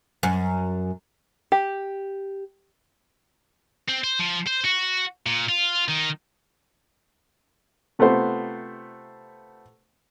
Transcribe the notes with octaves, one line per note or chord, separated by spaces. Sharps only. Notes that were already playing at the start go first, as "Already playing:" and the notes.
F#2
G4
C4
C5
F3
C5
F#4
A#2
F4
D#3
C3 A3 B3 F4 C5 F#5